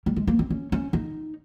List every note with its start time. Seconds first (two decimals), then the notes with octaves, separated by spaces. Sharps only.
0.06 G3
0.16 G#3
0.27 A#3
0.39 C4
0.50 C#4
0.72 C#4
0.93 D#4